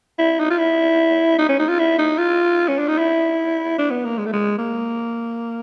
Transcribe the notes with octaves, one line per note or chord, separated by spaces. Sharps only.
E4
D#4
F4
E4
D#4
C#4
D#4
F4
E4
D#4
F4
C#4
D4
D#4
E4
D4
B3
A#3
G#3
A3
G#3
A#3